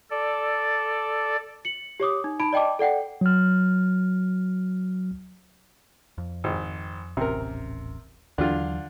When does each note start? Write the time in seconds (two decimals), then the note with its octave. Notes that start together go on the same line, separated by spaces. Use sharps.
0.10 A4 D5
1.65 C#7 F#7
2.00 G4 C#5 D6 D#6
2.24 D#4
2.40 D#4 A5 B5 D7
2.53 D5 D#5 G5 A5 D6
2.79 A4 D5 F#5 G5
3.21 F#3 F6
6.18 F2
6.44 G#1
7.17 D#1 A1 C3 C#4 A#4
8.38 D#2 D3 E3 F#3 F4